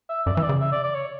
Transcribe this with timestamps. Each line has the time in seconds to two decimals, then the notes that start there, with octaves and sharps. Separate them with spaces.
0.09 E5
0.26 F#2 D5
0.35 E3 E5
0.43 D5
0.49 C#3
0.60 E5
0.72 D5
0.84 D5
0.94 C#5